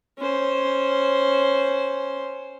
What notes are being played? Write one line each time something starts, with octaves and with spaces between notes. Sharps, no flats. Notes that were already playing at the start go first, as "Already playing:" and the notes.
C#4 C5